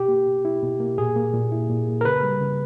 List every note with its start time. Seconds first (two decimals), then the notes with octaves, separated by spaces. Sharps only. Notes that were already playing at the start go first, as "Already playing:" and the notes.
Already playing: B2 G4
0.08 A#3
0.27 B2
0.45 E4
0.63 B2
0.80 A#3
0.98 A#2 G#4
1.16 A#3
1.34 A#2
1.52 E4
1.70 A#2
1.88 A#3
2.01 A#4
2.05 C#3 B4
2.23 G3
2.41 C#3